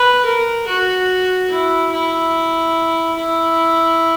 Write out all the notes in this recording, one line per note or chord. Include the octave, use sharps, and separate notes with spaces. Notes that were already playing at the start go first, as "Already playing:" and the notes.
Already playing: B4
A#4
F#4
E4
E4
E4